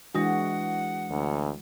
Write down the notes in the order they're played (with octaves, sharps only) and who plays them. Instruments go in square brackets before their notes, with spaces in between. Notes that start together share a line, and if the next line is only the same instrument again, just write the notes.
[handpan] E3 G#3 F#4 [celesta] D4 D#6 A#6 [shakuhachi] F#5
[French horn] D2